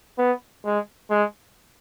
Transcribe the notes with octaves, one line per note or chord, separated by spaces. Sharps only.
B3
G#3
G#3